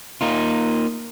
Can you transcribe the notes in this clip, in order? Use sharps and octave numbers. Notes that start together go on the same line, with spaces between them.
A#3 D#4 F4